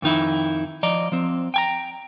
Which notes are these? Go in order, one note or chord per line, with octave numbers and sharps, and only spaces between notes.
F2 D#3 D#4 E4
F3 D5 D#5 A#5
F3 C4
G5 G#5 A#5